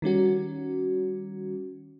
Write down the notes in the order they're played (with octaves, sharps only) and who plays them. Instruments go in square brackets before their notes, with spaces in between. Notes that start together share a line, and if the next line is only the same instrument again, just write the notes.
[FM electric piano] D#3 G3 C#4 F#4